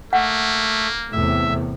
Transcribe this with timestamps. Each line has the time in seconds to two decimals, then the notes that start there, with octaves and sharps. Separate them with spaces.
0.13 A3 A#3 F#5
1.12 E2 A2 C3 E5